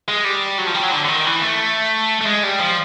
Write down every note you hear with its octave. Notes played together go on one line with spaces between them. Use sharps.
G#3
G3
F#3
F3
G3
F#3
D3
D3
D#3
E3
A3
A3
G#3
G3
F3